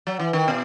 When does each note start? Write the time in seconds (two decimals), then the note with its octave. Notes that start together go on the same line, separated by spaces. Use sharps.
0.07 F#3
0.19 E3
0.33 D#3
0.48 B2